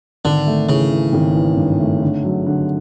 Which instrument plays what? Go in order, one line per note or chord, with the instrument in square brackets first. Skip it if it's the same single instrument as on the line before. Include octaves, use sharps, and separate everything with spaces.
[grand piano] G#1 [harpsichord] D3
[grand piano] A3
[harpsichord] C#3 [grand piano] E3
[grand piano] E3
G#1
E3
G2
A3
D3
F#3
D3